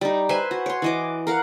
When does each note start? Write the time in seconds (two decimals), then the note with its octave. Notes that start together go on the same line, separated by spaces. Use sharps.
0.01 G3 D#4
0.29 B4 C5 E5 G#5
0.51 F#4
0.66 C#5 C6
0.82 E3 D#5 D6
1.27 A#4 F5 F#5